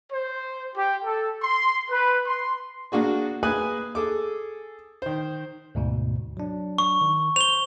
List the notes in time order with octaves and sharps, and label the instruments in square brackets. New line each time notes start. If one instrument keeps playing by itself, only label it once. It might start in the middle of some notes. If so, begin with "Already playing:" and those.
[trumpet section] C5
G4
A4
C6
B4
C6
[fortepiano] A#3 D4 F#4 G#4
A#3 G#4 B4 G#5 D#6 F#6
G#4 A4 D6
D#3 C5
[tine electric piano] D2 G#2 B2
F#3 D4
[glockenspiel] C#6
[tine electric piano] D#3
[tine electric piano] C5 [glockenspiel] F7 G7